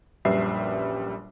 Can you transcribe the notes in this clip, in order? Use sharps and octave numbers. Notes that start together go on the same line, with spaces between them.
A#1 F#2 G3 B4 E5 C7